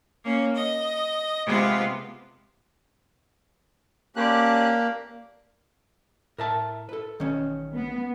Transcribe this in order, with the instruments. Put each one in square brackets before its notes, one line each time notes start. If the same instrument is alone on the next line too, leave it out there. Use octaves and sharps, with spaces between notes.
[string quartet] A#3 C#4
D#5
C3 G#3 B3 E4 F4
[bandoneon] A#3 [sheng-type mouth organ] C#4 G4 F#6 [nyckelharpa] D5 A5
[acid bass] A2 [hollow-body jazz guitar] A#4 E5 A5
[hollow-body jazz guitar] A4 B4
[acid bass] A1 [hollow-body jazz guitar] D#3 C#4
[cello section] B3